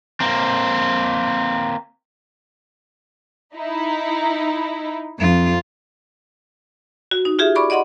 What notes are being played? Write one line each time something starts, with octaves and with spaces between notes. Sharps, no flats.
A#3 C4
D#4 E4
F2 F4
F#4
D#4
F4 G4 G#4 E5
D5 B5 C#6 D6
D5 D#5 F#5 B5 C6